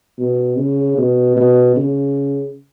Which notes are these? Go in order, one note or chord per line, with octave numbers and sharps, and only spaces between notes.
B2
C#3
B2
B2
C#3